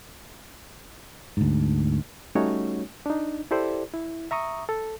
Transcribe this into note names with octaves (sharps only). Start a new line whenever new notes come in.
D2 G#2
G3 A3 C#4 D#4 F#4 C#5
D4 D#4
E4 G4 A4 C5 D5
E4
E5 A#5 C#6 D#6
A4